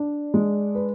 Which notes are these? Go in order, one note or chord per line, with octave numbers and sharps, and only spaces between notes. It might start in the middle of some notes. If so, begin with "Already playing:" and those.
Already playing: D4
G#3
B4